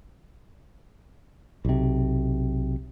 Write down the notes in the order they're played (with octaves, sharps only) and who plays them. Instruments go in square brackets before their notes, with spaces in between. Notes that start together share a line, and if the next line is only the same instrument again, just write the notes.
[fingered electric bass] B1 C3